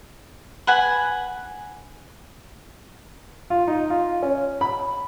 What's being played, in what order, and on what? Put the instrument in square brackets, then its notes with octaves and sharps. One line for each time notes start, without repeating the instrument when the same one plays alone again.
[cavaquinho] B4 F#5 G#5
[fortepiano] F4
D#4
F4
C#4
B5